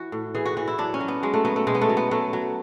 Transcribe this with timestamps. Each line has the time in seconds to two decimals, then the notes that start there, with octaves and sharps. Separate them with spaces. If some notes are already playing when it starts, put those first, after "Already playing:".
Already playing: E3 F#4
0.12 A2
0.35 E3 G#4
0.46 F#4
0.57 E3 F#4
0.68 E4
0.78 F#3 D4
0.94 C#4
1.00 F#3
1.08 B3
1.23 F#3 G#3
1.34 A3
1.45 F#3 B3
1.56 A3
1.67 B2 G#3
1.75 B3
1.81 A3
1.89 F#3
1.97 B3
2.11 F#3 A3
2.33 F#3